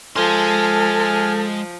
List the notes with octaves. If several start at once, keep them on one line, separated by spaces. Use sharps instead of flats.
F3 G#3 A4 G#5 C6 F6